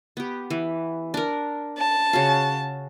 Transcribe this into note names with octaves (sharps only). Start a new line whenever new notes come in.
B3 G4
E3
D4 A#4
A5
C#3 F#4 F5